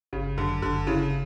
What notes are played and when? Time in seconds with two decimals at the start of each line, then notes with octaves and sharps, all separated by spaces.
0.13 G1 C#3
0.37 F#2 D3
0.62 G1 D3
0.87 C#3 E4